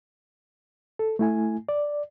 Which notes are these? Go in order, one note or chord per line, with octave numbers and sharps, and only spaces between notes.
A4
A3 E4 G#5
D5